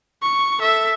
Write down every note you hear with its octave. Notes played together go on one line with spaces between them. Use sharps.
C#6
A4 E5